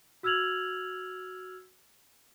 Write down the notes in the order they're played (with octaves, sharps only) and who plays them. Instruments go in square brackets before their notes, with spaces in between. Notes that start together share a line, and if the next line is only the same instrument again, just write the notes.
[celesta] F#4 E6 F6 G#6 F7 F#7